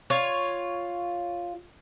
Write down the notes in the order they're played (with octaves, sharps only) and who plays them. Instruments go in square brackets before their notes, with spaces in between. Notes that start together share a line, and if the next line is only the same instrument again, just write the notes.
[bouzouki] F4 C#5